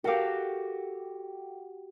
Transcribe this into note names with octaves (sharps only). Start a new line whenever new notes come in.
F#4 G4 A4 A#4 F5